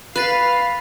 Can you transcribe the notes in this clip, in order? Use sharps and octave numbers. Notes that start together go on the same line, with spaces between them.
B4 F5 B5 F#6 A6 B6